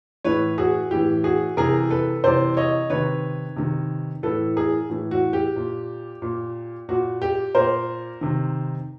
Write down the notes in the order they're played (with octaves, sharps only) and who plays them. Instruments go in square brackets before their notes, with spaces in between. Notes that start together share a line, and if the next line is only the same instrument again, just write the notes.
[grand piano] A2 E3 B4 C#5
F#4 G#4
A2 E3 G4
F#4 G#4
C3 E3 G#4 A#4
A4 B4
C3 E3 C5 D5
C#5 D#5
C3 D#3 B4 C#5
C3 D#3
A2 E3 A4 B4
G#4 A#4
A2 E3
F#4
G4
A#2
A#2
A#2 F#4
G4
A#2 A#4 C5
C3 D#3